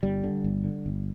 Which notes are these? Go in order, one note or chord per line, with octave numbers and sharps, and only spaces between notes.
G1 G3
D3
G1
D3
G1